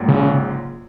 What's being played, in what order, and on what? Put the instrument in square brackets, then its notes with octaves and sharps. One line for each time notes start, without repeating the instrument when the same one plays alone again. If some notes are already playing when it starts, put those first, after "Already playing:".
Already playing: [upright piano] A#1 G#2 F#3 A#3
[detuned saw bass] C#3